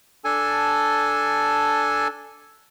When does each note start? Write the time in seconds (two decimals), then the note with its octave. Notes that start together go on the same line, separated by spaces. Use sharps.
0.25 D4 A4 G#5